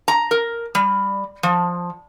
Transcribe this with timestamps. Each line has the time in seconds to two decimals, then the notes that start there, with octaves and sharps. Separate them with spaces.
0.08 A#5
0.31 A#4
0.75 G3
1.43 F3